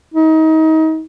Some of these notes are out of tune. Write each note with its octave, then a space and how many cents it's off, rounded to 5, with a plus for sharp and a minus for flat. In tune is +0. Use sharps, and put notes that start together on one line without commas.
D#4 +30